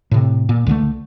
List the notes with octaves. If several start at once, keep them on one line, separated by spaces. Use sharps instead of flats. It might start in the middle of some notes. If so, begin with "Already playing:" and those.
A2 C3
A#2
C#2 D3 D#3 A3